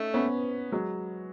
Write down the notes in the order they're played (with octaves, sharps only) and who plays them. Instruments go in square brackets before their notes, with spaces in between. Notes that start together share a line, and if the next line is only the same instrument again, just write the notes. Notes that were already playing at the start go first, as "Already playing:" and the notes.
Already playing: [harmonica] A3 [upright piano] C#4 D#4
[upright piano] B3 C#4
F#3 G#3